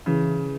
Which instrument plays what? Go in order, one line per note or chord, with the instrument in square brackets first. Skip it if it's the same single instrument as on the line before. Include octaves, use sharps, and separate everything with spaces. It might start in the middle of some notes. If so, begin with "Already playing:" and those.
[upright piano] C#3 [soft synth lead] E3